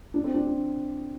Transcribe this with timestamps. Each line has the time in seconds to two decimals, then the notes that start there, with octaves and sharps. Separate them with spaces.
0.14 D4
0.24 C4
0.34 D4
0.45 D4